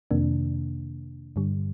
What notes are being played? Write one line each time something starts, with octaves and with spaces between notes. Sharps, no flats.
F2 C3 D#3 A#3 D4
G2 D3 G3